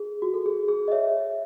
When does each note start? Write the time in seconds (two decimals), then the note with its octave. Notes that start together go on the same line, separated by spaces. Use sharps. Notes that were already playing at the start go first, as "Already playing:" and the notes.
Already playing: G#4
0.22 F#4
0.34 A4
0.46 G#4
0.68 G#4
0.88 D#5
0.92 C#5 E5